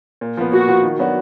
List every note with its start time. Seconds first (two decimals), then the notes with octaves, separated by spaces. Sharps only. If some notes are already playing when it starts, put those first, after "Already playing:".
0.21 A#2
0.37 F3 B3
0.52 A#2 F#4
0.68 F3 B3
0.83 D#3
0.99 F#3 B3 D4 F#4